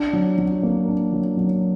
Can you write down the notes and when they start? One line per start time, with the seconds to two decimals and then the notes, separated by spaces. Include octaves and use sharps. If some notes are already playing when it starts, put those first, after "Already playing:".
Already playing: D4
0.13 F#3
0.38 F#3
0.63 A#3
0.88 D4
1.13 F#3
1.37 F#3